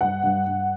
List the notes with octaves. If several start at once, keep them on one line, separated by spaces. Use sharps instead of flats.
G2 F#5
G2
G2